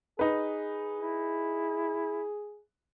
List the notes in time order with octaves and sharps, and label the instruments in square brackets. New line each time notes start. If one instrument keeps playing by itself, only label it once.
[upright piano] D#4 B4 [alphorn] G#4
[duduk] E4